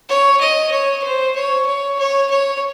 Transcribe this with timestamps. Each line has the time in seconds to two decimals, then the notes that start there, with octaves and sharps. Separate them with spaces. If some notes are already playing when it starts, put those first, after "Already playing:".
0.09 C#5
0.40 D#5
0.71 C#5
1.03 C5
1.35 C#5
1.66 C#5
1.99 C#5
2.30 C#5